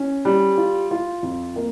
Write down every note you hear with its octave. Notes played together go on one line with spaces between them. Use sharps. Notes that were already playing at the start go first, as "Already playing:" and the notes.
Already playing: C#4
G3
F4
F4
F2
A#3